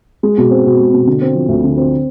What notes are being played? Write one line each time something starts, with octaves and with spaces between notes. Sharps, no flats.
G#3
B2
C4
B2
G#3
B2
D3
C4
F3
D2
D3
C4